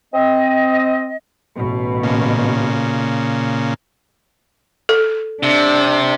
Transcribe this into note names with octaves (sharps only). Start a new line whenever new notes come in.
C4 D#5
A1 B2
A#2 C#3
A4
C3 D4